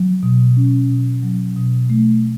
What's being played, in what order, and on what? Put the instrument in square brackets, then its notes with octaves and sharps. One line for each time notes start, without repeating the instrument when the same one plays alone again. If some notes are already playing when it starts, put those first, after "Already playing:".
Already playing: [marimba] F#3
B2
C#4
B2
F#3
B2
A3